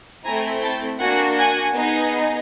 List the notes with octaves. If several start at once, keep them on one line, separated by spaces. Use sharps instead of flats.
A3 C4 E4 G#5 A#5
G5 A5
A#3 D4 F#4 F#5 G#5
F#5 G#5
B3 D#4 G#4